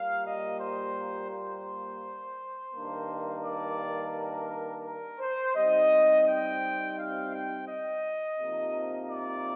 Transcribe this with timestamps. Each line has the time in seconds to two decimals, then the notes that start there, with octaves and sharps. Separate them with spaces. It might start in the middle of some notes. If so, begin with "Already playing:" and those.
Already playing: A#2 G3 A#3 F5
0.25 D#5
0.59 C5
1.31 C5
2.72 G2 D#3 A#3 D4
3.43 D5
4.14 A#4
4.85 A#4
5.20 C5
5.56 C3 G3 C4 D#4 D#5
6.27 G5
6.98 F5
7.34 G5
7.68 D#5
8.40 C3 F3 A#3 D#4
9.10 D5